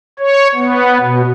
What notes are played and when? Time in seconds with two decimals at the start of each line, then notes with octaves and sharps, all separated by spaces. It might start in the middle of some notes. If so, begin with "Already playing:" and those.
0.19 C#5
0.55 B3
1.00 B2